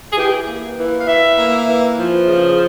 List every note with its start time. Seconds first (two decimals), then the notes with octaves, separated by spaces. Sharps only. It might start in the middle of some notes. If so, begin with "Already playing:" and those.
0.13 G#4
0.18 E3 G4
0.48 A#3
0.78 E3
1.00 F5
1.07 E3 E5
1.38 A#3
1.68 E3
1.98 F3
2.27 C#3